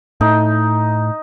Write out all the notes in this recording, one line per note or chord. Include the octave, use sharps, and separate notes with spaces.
A2 D#4